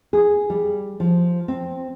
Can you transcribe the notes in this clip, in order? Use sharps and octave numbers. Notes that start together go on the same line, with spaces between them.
G#4
G3
F3
C4